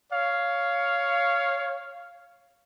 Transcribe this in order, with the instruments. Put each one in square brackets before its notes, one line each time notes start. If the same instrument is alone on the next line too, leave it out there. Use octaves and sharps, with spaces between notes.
[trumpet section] C#5 F5